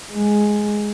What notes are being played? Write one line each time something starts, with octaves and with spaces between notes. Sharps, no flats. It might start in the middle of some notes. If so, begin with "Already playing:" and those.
G#3